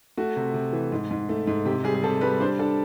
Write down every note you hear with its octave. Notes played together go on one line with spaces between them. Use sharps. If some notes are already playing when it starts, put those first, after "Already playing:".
A3 F#4
C3
C3
E3
G#2
G#2
A3
G#2
C3 G4
G3 G#4
G#4
C3 A4
G3 B4
D4 C5
D4 A4